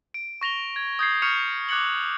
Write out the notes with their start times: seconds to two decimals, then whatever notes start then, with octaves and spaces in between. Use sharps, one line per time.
0.14 D7
0.41 C#6 A#6 F7 G7
0.76 G#6
0.99 D#6 G6 G#6 C7
1.22 C#6 F6 G6 C#7 F7
1.69 D6 F#6 G#6 C#7 F#7